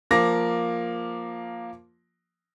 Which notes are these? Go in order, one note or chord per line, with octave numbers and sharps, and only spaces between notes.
F3 A#3 D6 A#6